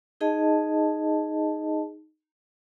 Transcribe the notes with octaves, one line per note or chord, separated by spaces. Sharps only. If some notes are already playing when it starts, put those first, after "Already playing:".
D#4 G#4 D#5 A5